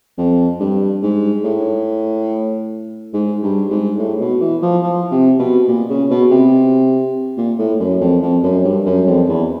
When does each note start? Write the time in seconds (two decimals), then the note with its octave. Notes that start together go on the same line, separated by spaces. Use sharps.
0.17 F2
0.60 G2
1.02 G#2
1.44 A2
3.14 G#2
3.42 G2
3.70 G#2
3.98 A2
4.20 B2
4.41 E3
4.62 F3
4.83 F3
5.11 C3
5.39 B2
5.68 A#2
5.89 C#3
6.10 B2
6.31 C3
7.37 A#2
7.59 A2
7.80 F#2
8.01 F2
8.22 F2
8.44 F#2
8.64 G2
8.86 F#2
9.07 F2
9.28 E2